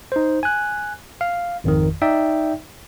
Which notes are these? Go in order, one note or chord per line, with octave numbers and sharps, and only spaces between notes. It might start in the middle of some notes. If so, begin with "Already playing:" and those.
D#4 C5
G#5 F#6
F5
G#1 F2 D#3
D#4 D5 E5 G5